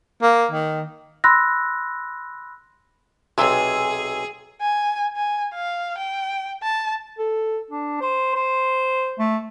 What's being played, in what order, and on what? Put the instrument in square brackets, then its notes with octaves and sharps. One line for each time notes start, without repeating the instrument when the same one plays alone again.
[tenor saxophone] A#3
D#3
[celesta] B5 C6 E6 F#6 A#6
[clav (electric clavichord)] B1 C3 [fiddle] G#4 [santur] G#5 E6
[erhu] G#5
G#5
F5
G5
A5
[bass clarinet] A4
D4
C5
C5
A3